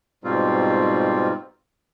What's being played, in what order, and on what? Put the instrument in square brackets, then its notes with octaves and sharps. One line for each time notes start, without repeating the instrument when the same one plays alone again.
[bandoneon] G#2 B2 G3 C4 F4